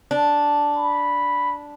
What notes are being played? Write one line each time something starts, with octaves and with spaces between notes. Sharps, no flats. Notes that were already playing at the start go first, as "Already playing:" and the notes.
D4
B5